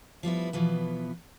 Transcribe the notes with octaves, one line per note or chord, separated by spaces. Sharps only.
F3 G3 B3 E4
B2 E3 F3 B3